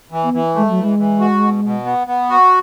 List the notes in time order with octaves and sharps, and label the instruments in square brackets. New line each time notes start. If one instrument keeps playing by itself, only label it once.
[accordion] E3
[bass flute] B3
[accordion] E3
[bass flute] G#3 [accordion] A3
[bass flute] F#3
[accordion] E3
[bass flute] G#3
[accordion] E3
F#4
B2
B2
B3
B3
F#4